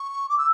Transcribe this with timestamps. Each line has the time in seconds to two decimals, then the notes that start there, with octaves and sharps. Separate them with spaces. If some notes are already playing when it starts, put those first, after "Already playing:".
Already playing: C#6
0.29 D6
0.38 E6